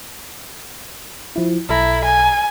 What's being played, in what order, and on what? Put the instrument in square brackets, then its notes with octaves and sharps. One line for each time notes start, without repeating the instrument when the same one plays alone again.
[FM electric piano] F3 E4
[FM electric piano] B1 A4 A#5 [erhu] E4
[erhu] G#5